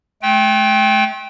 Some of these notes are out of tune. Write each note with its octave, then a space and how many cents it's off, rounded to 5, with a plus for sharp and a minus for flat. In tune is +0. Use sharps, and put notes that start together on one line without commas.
A3 -40 G5 +0